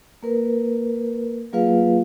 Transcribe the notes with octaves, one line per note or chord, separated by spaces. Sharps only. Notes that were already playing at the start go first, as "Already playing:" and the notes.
A#3 A#4 B4
F#3 A#3 F4 G#4 B4 F5